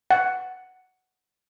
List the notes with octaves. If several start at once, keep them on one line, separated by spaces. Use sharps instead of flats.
F#5